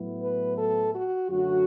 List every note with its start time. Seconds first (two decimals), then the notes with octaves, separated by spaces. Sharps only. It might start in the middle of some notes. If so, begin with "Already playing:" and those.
Already playing: A2 F#3 B3 E4
0.21 B4
0.58 A4
0.94 F#4
1.30 F#2 D3 F#3 A3 F#4